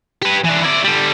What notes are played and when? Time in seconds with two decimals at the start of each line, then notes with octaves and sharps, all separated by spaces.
0.22 G4 B4
0.44 E3 D4
0.64 E4 D5
0.84 D3 G3